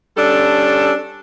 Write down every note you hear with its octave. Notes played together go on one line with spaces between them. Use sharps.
G3 C#4 D4 A4